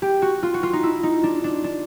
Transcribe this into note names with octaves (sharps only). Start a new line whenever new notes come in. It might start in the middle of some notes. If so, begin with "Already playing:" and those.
G4
F#4
F4
F#4
F4
D#4
E4
D#4
D4
D4
D4